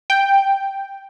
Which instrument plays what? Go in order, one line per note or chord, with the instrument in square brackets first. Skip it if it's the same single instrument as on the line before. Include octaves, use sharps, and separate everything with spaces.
[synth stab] G5